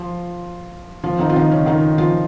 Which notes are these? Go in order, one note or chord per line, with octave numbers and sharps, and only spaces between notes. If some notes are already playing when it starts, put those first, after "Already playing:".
Already playing: F3 F4
F3 F4
D#3 D#4
F4
D#3 D#4
C#3 C#4
D#3 D#4
F3 F4